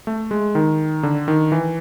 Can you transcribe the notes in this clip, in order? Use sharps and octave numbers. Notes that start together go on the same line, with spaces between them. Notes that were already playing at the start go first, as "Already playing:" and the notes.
A3
G#3
D#3
D3
D#3
E3